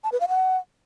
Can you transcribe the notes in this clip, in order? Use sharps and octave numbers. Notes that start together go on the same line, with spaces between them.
A5
B4
F5
F#5